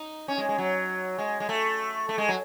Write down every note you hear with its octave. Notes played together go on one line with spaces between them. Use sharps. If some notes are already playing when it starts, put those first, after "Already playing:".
Already playing: D#4
C#4
G#3
G#3
F#3
G#3
G#3
A3
A3
G#3
F#3